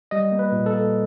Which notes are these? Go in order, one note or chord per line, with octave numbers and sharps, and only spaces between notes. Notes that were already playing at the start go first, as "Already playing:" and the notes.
G3 D#5
A#3
B4
A#2
A4
A#3